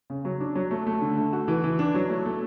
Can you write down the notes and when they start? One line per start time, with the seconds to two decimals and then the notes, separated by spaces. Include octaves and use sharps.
0.10 C#3
0.25 F#3
0.40 D4
0.55 F#3
0.71 A3
0.87 A3
1.02 D3
1.17 A3
1.33 F#4
1.48 E3
1.64 E3
1.79 D4
1.94 F#3
2.09 A3
2.26 A3